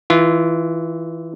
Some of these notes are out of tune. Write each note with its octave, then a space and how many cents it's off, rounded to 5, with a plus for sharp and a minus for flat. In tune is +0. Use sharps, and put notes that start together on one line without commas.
E3 -10 F4 -25